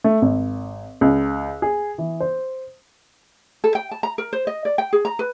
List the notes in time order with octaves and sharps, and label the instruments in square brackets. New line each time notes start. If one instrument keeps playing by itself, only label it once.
[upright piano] A3
G#1
C#2
G#4
E3
C5
[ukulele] A4
G5
A5
A#5
A#4
C5
D#5
D5
G5
G#4
A#5
B4